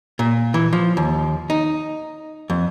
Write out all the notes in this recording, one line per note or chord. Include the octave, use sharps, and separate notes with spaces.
A#2
E3
F3
D#2
D#4
F2